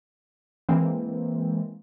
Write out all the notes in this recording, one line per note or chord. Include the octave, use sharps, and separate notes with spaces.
E3 G#3 A#3 C4